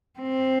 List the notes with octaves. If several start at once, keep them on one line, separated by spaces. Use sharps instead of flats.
C4